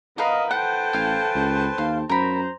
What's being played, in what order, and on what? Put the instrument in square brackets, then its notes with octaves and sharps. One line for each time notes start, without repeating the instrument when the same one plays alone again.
[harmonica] B3 [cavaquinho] A#4 B4 F5 [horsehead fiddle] D#5
[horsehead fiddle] A4 G5 [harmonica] B4 C5 A5 [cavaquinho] F#5
[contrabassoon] A1 [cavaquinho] F5 G#5
[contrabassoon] C#2
[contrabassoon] D#2 [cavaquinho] F5
[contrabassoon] F#2 [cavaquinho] A#4 B5 [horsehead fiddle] C5 A#5